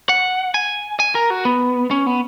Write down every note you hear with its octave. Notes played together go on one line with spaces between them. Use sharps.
F#5
G#5
G#5
A#4
F#4
B3
C#4
B3